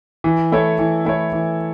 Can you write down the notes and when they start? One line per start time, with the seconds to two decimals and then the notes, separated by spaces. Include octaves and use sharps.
0.24 E3
0.52 A3 E4 A4 C#5
0.79 E3
1.05 A3 E4 A4 C#5
1.33 E3